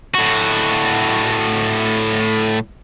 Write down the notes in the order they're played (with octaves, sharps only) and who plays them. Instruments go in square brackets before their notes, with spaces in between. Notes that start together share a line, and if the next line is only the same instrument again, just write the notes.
[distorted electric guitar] A2 F#4